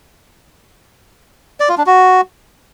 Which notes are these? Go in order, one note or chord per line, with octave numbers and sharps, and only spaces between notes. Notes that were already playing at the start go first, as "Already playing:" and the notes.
D5
F4
D4
F#4